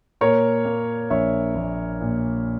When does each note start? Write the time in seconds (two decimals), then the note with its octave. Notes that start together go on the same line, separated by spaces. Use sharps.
0.21 A#2 A#4 C#5
0.65 A#3
1.10 A#1 C#5 E5
1.55 A#1
2.00 A#2